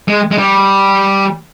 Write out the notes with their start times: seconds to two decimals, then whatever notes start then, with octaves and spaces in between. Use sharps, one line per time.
0.08 G#3
0.32 G#3
0.38 G3